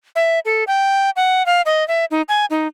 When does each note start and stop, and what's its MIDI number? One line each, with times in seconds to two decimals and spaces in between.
0.16 0.39 76
0.45 0.64 69
0.67 1.10 79
1.16 1.45 78
1.46 1.62 77
1.66 1.86 75
1.88 2.05 76
2.11 2.22 63
2.29 2.45 80
2.50 2.67 63